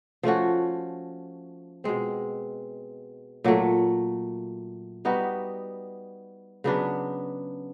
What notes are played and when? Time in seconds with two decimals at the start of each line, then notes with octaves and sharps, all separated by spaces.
0.23 F3 A3 C#4 F#4
1.84 B2 G#3 C4
3.44 A#2 F#3 A3
5.05 G3 B3 D#4 F#4
6.64 C#3 F#3 B3 D4